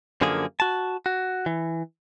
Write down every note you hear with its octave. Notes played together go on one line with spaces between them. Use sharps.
F#2 D3 F3 A#3 G#4
F#4 A5
F#4
E3